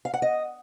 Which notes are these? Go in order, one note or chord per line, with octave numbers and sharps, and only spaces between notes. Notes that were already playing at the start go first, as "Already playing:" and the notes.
F5
F#5
D#5